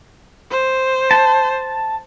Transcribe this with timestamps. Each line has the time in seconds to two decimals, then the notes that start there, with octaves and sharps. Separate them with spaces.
0.51 C5
1.11 A5